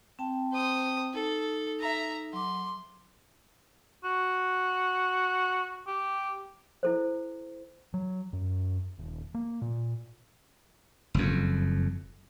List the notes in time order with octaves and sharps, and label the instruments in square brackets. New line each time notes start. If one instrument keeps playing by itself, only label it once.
[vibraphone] C4 G5 A5
[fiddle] C5 D#6
[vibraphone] D#4 [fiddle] A4
[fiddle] E5 A#5
[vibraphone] F#3 D6 [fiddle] C6
[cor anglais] F#4
G4
[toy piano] E4 A4 C5
[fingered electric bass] F#3
F#2
D#1
A#3
A#2
[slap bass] F#1 F2